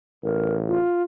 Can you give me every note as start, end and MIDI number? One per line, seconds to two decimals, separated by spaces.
0.24 0.76 33
0.24 0.56 70
0.68 1.03 65